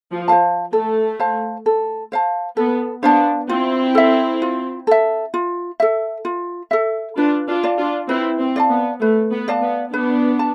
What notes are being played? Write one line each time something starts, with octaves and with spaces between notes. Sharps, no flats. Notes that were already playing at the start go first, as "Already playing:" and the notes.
F3
C5 F5 A5
A3 A4
C5 F5 A5
A4
C5 F5 A5
B3 A4
B3 D4 C5 F5 A5
C4 E4 F4
A4 E5
F4
A4 E5
F4
A4 E5
F4
A4 E5
D4 F4 B4
D4 F4
D5 F5 A5
D4 F4
C4 E4 B4
C4
D5 F5 A5
B3
A3 B4
B3
D5 F5 A5
B3
B3 D4 B4
A5